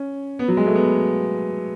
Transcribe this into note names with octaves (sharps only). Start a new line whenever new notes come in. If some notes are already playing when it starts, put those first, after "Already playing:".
Already playing: C#4
B3
F#3
G#3
A3
B3